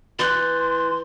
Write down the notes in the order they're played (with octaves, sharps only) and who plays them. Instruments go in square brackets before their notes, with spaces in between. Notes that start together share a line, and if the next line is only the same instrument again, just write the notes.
[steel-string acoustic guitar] E3 [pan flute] C6 [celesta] F#6 G6 A6